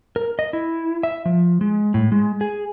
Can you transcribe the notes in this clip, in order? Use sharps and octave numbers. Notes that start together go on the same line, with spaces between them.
A#4
D#5
E4
E5
F3
G#3
A2
G#3
G#4